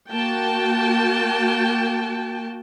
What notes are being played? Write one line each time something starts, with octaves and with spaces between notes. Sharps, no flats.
A#3 F#4 G5 A5